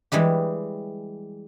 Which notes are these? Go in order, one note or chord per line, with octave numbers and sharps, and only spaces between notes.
E3 G3 G#3 G4